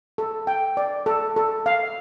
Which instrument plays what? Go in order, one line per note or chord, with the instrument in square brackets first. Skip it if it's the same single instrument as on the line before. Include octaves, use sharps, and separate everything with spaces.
[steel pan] A4
G5
D5
A4
A4
F5